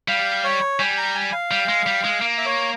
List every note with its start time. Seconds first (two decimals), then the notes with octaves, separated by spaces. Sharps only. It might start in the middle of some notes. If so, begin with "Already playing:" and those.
0.08 G3 F5
0.44 C#5
0.79 G3 G#5
0.98 A#5
1.15 G#5
1.32 F5
1.51 G3
1.68 G#3
1.86 G3
2.04 G#3
2.21 A#3
2.38 E5
2.46 C#5